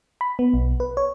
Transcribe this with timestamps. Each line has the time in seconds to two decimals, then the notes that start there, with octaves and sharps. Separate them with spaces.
0.21 B5
0.39 B3
0.54 B1
0.80 B4
0.97 C#5